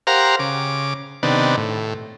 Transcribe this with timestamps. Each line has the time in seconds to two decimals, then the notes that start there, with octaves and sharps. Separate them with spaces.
0.07 G4 A#4 C5 F5 F#5 A#5
0.39 C#3 D6
1.23 C3 D#3 B3 D4
1.57 A2